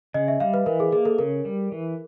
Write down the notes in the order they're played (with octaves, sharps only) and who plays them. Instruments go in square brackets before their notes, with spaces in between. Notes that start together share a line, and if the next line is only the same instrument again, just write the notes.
[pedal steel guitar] C#3 [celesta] D#5
[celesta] E5
[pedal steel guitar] G3 [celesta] F5
[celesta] B4
[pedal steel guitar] E3 [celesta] A#4
[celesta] G#4
[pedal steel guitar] A#3 [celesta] G#4
[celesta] A4
[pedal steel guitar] C#3 [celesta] A#4
[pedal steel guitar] G3
E3